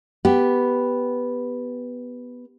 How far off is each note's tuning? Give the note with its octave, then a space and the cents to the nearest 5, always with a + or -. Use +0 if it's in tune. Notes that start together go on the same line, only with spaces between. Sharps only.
B3 +0 G4 +0